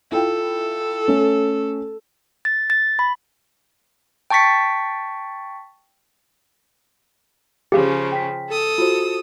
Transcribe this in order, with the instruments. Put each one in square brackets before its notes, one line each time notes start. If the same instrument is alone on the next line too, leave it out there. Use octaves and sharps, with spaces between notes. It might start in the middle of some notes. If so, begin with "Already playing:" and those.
[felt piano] E4 F4 G5 [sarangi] A4
[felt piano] A3 C#4
[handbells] A6
A6
B5
G5 A5 C#6 A6 B6 C#7
[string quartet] C#3 F3 C#4 [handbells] G4 G#4 F5
[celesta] G5 B6
[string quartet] A4 D#6 E6
[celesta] F4 F#4 C5